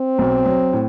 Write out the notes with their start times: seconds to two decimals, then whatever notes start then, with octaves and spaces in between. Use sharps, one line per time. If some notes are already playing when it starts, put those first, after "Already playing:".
Already playing: C4
0.18 B1
0.46 F#3
0.73 A2